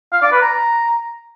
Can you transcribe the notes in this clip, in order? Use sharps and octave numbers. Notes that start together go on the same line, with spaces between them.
F5
D5
B4
A#5